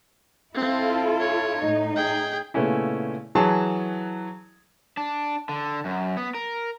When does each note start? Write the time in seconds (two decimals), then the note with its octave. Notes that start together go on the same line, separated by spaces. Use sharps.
0.55 C4 E4 F4 A4
1.20 C#5
1.59 A2 D#4
1.96 G#4 G5
2.54 A#2 C#3 A3 B3 C#4 E4
3.35 E3 F#3 G#4 C#5 A5
4.97 D4
5.49 D3
5.85 F#2
6.17 B3
6.35 A#4